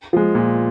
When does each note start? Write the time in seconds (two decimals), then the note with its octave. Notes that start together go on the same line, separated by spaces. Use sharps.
0.13 F3 G#3
0.35 A#2